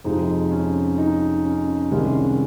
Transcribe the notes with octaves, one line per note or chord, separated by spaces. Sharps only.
F2 C3 F3 G#3 D#4
C#4
D#4
C#4
C2 C3 D#3 G#3 C#4